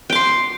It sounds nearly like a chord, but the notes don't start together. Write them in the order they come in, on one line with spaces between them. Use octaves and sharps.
G5 D6 C6